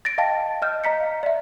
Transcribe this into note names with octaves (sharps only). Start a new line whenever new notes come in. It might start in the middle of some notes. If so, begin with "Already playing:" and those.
A6 A#6 D7
D#5 F5 G5 A5 A6
D#5 F6 G6
D#5 A#5 B6 C#7
F5
D5 E5